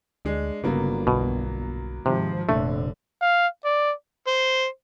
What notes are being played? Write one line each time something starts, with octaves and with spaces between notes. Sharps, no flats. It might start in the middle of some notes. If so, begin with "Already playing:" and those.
D2 G#3 D4
G1 C#3 F#3 A#3 B3
B1 B2
G#2 C3 D#3 F3
F1 A#2 D3 A3
F5
D5
C5